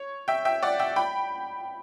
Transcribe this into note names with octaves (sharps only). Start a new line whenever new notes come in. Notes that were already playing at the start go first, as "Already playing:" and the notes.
Already playing: C#5
E5 G5
E5 G5
D5 F#5
E5 G5
G5 B5